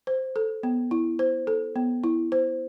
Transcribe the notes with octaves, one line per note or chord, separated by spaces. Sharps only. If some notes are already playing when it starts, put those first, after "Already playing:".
C5
A4
B3
E4
C5
A4
B3
E4
C5